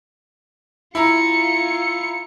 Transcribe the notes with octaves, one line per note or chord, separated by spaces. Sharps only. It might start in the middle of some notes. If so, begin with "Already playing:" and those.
E4 F4 A#5 C#7